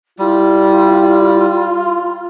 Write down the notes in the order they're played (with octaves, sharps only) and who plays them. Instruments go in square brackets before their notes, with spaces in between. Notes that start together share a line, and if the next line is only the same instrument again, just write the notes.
[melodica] G3 [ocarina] E4 [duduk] F4